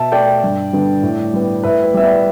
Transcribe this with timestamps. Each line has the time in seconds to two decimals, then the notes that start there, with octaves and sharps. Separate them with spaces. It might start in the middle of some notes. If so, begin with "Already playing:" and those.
Already playing: B2 E5 A5
0.12 A3 D5 G5
0.43 G2
0.73 D3 G3 B3
1.03 A2
1.33 G3 B3
1.64 A2 B4 E5
1.84 B4
1.94 G3 B3 E5
2.04 D5